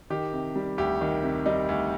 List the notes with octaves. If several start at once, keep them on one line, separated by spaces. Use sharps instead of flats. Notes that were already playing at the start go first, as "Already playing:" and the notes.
D#3 G4
C3
G3
D2 G4
D#3
C3
G3 D#4
D2